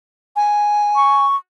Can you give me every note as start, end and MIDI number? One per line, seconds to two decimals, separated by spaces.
0.36 1.25 80
0.96 1.36 85